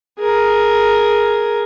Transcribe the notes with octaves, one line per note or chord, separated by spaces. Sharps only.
G#4 A#4